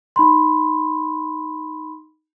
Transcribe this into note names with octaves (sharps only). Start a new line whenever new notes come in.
D#4 B5 C6